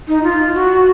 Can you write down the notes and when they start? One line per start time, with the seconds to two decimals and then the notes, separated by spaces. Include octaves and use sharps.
0.08 D#4
0.23 F4
0.55 F#4